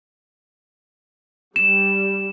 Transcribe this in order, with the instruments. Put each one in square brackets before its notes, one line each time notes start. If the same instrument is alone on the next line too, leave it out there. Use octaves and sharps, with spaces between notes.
[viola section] G3 [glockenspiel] E7